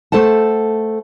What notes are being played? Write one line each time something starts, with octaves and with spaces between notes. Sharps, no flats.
A3 A4 C5 F#5 A5